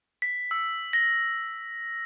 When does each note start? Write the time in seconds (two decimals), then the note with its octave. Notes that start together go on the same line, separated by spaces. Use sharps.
0.22 B6
0.51 E6
0.93 A#6